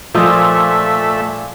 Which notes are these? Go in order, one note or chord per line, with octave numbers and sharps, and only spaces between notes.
A#2 F3 A3 F4 D#5 E5